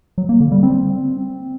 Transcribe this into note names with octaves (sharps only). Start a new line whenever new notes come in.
F#3
A#3
D3
G3
C4